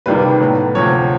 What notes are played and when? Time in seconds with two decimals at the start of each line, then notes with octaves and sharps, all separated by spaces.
0.06 C#2 C3 D#3 G3 A#3 B4
0.40 A2 F#3 B3
0.75 D2 C3 F3 C#5